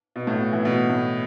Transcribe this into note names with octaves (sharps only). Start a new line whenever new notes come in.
B2
A2
B2
E3
B2
A2